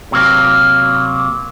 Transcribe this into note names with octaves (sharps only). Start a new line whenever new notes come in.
C3 F#3 A#3